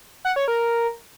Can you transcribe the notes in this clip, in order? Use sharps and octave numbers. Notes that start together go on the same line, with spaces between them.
F#5
C#5
A#4